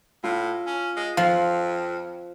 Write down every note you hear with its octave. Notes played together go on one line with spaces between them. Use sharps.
A2 F4
C#4
G#3
F2 F3 F5